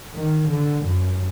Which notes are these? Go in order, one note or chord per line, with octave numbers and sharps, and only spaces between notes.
D#3
D3
F#2